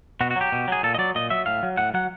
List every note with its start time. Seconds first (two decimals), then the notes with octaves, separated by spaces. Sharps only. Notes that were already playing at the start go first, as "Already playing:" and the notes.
0.21 B2 F#4
0.31 F#4
0.36 F#3 G4
0.52 B2
0.68 F#3 G#4
0.83 A#2 A4
0.95 D#5
0.98 F#3 D5
1.15 A#2 D#5
1.30 F#3 E5
1.46 A2 F5
1.63 F#3
1.77 A2 F#5
1.94 F#3 F#5